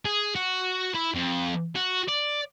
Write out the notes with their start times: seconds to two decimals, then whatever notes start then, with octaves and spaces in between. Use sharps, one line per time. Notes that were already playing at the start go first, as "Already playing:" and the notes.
0.05 G#4
0.35 F#4
0.94 E4
1.14 F2
1.75 F#4
2.08 D5